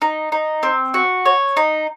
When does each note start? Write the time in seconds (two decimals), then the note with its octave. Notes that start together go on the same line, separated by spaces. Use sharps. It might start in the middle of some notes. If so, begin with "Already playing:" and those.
0.02 D#4
0.32 D#4
0.63 C4
0.94 F#4
1.25 C#5
1.57 D#4